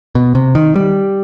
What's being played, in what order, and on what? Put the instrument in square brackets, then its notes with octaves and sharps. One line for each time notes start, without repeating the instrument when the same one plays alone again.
[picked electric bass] B2
C3
D#3
G3